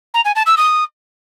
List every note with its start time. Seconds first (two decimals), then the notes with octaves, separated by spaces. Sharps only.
0.14 A#5
0.25 G#5
0.36 A5
0.46 E6
0.57 D#6